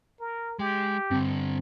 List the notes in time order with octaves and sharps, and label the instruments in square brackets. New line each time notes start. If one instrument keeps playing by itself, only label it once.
[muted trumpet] A#4
[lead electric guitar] G#3 [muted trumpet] G4
[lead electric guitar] G2 D3 [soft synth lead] C4